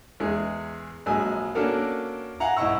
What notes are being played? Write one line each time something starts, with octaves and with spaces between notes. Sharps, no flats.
E2 G#3
A#1 F#3 G#3 G#5 E6
A#3 C#4 D4 F#4 A4 A#4
F5 F#5 G#5 A#5
C2 E4 D#5 F#5 C#6 E6